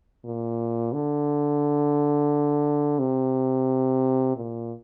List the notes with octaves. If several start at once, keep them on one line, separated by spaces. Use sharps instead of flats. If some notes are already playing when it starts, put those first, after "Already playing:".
A#2
D3
C3
A#2